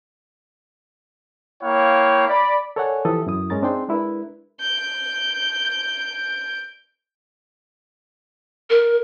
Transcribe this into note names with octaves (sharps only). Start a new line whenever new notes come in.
A#3 E4 C#5 F5 G5
D5 B5
A4 A#4 C#5 D5 F#5 G#5
E3 F3 G4 A4 D#6
F#2 E4 D#6
G2 G#3 C#4 A#4 A#5 A6
C4 D4 D#4 G#4 G5 C6
G#3 D4 E4 A#4 B4
G6 D7
A#4